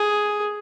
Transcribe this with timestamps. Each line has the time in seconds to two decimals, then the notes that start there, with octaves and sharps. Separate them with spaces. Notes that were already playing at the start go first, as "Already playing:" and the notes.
Already playing: G#4